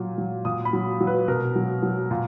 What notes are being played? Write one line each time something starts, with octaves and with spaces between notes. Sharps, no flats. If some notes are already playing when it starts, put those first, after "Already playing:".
Already playing: A#2 F#3
F#3
A#2 D#6
B5
F#3
F#3
B4
B2 A#4
F#3
F#3
A#2